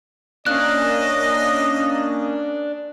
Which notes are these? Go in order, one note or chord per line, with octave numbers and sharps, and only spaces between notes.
A#3 C#4 D4 D#5 F#6